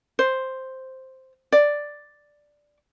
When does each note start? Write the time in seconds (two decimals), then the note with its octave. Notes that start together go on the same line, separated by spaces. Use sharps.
0.19 C5
1.52 D5